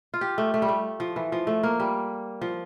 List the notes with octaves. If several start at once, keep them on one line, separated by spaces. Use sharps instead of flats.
F4
G4
A3
A3
G3
A3
F3
E3
F3
A3
A#3
G3
F3